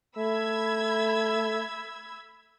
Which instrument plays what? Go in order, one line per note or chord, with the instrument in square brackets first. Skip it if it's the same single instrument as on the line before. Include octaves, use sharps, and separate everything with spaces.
[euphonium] A3 [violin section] B5 E6 G#6